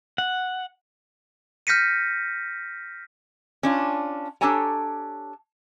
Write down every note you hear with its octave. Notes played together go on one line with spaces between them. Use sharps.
F#5
F6 G6 A#6 B6 C#7 D#7
C#4 D4 F4
D4 G4 A4 C#5 G#5 A#5